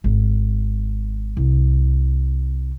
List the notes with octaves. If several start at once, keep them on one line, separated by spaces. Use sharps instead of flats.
G#1
C2